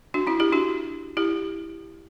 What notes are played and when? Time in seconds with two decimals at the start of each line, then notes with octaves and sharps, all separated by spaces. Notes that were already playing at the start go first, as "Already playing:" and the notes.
0.14 D4 F#4
0.27 C#4 E4
0.40 E4 G4
0.52 D4 F#4
1.17 E4 G4